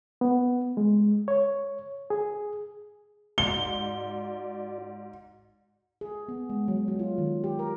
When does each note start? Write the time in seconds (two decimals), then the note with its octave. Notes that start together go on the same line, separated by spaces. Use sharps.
0.21 B3
0.77 G#3
1.28 C#5
2.10 G#4
3.38 G#2 F#4 D5 G7
6.01 G#4
6.28 B3
6.50 G#3
6.68 F#3
6.88 F#3
6.99 F4
7.18 D#3
7.44 G4
7.59 A#4